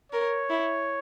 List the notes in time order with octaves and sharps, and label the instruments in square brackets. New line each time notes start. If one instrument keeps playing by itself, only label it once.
[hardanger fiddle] A#4 [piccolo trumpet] C#5
[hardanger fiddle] E4